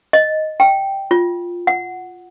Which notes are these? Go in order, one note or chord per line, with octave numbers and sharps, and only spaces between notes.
D#5
G5
F4
F#5